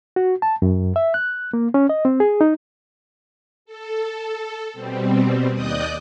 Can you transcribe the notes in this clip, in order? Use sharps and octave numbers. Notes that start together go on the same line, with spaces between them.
F#4
A5
F#2
E5
F#6
A#3
C#4
D#5
C4
G#4
D#4
A4
B2 G3 C4
D#2 D5 D#5 D#6 F#6 G6